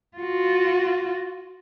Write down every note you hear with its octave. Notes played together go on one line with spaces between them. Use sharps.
F4 F#4